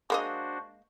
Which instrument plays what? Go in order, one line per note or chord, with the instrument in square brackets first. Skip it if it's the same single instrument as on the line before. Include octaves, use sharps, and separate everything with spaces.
[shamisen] G#3 A#3 D#5 [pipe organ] D4 F#4 C5